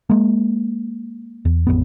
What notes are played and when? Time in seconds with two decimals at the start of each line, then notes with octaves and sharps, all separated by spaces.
0.10 G#3 A#3
1.45 E2
1.67 A1 F2 B3